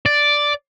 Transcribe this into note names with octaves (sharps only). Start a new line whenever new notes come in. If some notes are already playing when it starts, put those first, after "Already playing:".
D5